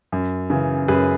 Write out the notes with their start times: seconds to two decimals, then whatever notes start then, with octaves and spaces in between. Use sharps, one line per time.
0.12 F#2
0.50 C#3 E3
0.88 F#2 G#4 B4